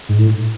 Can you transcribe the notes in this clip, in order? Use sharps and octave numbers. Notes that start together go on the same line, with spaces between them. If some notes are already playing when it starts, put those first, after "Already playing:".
G#2
A2